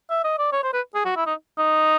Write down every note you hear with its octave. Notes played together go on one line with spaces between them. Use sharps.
E5
D#5
D5
C#5
C5
B4
G#4
F#4
E4
D#4
D#4